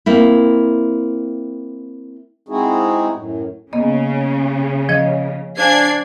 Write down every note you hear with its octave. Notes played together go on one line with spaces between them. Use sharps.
A#3 C4 E4
G#3 C4 D#4 E4 F#4 G#4
F#2 A2
C#3 A#3 B3 D#5
F3 C#5 D#5
D4 C5 F5 G#5 G#6 C7